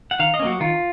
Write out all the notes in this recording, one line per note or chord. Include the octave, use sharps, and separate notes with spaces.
F#5
D#3 F5
D#5
C#4
F#3 A#3 F#4
D#3 F4